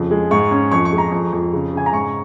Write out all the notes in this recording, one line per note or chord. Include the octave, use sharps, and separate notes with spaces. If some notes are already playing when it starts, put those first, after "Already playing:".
Already playing: F2 C#3
G#3
G#2 C#6
C#4
F2 C#6
C#6
G#3
A#5
F2
F2
C#3
C#3 G#5
A#5
G#2 C#6